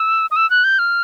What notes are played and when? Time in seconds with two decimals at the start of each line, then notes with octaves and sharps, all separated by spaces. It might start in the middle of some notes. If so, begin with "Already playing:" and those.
Already playing: E6
0.31 D#6
0.36 E6
0.50 F#6
0.64 G6
0.79 F6